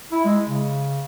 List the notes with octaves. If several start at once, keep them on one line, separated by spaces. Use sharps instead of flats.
E4
G#3
C#3